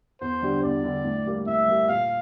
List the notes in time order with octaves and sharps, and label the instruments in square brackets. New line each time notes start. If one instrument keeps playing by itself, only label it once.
[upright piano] E2 [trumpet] C5
[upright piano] D3 G3 D4 G4
[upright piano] E2 [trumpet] D5
[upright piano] D3 G3 D4 G4
A2
G3 A#3
[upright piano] A2 [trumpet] E5
[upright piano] G3 A#3
[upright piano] A#2 [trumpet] F5